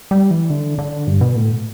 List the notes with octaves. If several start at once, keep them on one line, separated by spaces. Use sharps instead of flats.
G3
E3
D3
D3
G2
B2
A2